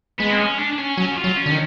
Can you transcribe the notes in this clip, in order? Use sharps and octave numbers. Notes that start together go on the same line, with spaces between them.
G#3 B3
C4
C#4
D4
D4
C#4
F#3 C#4
F#4
F4
F#3
C#4
D3
D#3